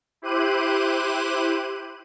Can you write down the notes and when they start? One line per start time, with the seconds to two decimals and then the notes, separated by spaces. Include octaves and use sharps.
0.22 E4 G4 C5 F#6 D#7